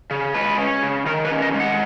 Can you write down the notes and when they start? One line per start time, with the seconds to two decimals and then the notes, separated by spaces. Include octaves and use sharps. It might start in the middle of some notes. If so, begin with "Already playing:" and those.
0.11 C#3
0.34 G#3 B4
0.58 C#4
0.83 C#3
1.06 D#3 A#4
1.25 B4
1.31 C#4
1.42 D#5
1.54 G#3
1.60 F#5